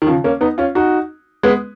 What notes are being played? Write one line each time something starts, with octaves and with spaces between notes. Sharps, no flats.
D#3
C#3 F3
A#3 C#4
B3 D#4
C#4 F4
D#4 F#4
G#3 B3